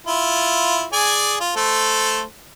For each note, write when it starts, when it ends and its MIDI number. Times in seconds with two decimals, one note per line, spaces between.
0.07 0.85 64
0.07 0.85 65
0.93 1.35 68
0.93 1.35 74
0.93 1.35 80
1.40 1.53 65
1.56 2.22 57
1.56 2.22 69
1.56 2.22 72